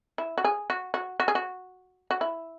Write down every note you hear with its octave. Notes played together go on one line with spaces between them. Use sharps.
E4
F#4
G#4
F#4
F#4
F#4
G#4
F#4
F#4
E4